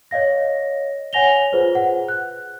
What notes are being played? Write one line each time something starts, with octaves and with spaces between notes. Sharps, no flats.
C#5 D#5 F5 A#6
C#5 F#5 G#5 A#6 F7 G7
F4 G#4 B4 C5
F#5
F#6